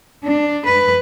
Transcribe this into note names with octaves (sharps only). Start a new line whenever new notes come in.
D4
B4